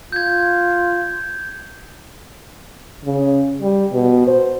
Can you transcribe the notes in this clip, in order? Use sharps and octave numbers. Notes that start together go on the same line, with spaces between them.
F4 G6 G#6
C#3
G3
B2
C5